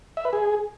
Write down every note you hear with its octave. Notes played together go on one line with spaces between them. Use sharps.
E5
B4
G#4